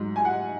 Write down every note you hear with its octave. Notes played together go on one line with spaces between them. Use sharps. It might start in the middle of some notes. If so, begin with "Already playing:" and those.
Already playing: G#2 F#3
G#5
F#5